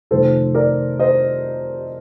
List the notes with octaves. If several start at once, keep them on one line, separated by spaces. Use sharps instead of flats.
F2 C3 D#3 A3 A4 C5
A#4 D5
C5 D#5